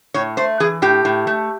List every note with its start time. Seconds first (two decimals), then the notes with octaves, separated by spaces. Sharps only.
0.14 A2 C#5
0.37 A3 C5
0.60 E3 G#4
0.82 A2 G4
1.05 A2
1.27 A3